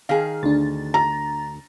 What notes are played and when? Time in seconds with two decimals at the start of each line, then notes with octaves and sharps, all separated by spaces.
0.09 D#3 G#4 F5 F6
0.43 D2 D4 A6
0.94 A#5